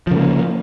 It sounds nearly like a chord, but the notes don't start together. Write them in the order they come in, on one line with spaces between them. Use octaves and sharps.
F3 C#3 A3 A#3